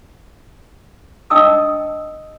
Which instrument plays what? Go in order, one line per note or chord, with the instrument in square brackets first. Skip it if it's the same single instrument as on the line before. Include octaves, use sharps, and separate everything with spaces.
[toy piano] D4 D#5 G5 A5 D#6 E6